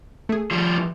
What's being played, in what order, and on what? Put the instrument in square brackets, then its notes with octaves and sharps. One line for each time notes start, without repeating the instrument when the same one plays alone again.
[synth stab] A3 G#4
[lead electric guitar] F3 G3
[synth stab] E3